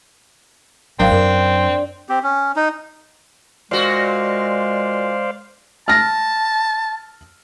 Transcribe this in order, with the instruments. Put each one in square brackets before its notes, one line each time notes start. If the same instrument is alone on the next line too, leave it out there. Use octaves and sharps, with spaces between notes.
[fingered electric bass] G#1 F#3 [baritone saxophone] C4 [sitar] D4 [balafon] A#4 F5 G5
[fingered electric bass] F#2 [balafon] A#4
[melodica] C4 G4
C#4
D#4
[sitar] A#2 F#4 [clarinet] G#3 [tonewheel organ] C5 D5 F5
[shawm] A5 [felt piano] F6 A#6